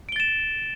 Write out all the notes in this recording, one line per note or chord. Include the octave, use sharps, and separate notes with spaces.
A6 D7 E7 G7